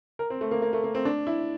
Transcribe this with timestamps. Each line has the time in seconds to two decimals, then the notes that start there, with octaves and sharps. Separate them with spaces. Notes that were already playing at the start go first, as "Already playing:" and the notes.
0.19 A#4
0.30 C4
0.41 A3
0.51 A#3
0.62 A#3
0.73 A3
0.84 A#3
0.95 C4
1.05 D4
1.27 E4